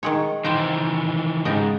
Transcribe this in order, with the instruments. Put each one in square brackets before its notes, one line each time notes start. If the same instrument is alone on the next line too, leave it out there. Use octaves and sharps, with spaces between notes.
[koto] D#3 G#3 C#5
[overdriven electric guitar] D#3 E3 [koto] C5 G5
[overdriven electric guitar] G#2 [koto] C#3 D#5 G5